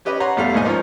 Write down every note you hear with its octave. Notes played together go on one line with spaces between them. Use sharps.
C#4 G4 B4 D#5
C#5 F#5 A#5 C6
A1 E2 G3 A3 F5
D#2 G#2 D#4 D#5 G#5
F3 A#3 C#4 D#4 A#4 C#5